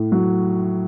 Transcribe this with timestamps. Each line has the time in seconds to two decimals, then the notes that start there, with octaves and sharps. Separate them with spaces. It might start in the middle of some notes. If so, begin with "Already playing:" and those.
Already playing: A2
0.12 F#3